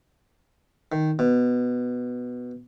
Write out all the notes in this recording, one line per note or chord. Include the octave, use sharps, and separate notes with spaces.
D#3
B2